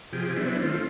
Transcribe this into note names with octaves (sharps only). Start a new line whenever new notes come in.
C3 F3 G4 G#4
F#3 B3 C4 D4 E4
D#3 A3 C4 F4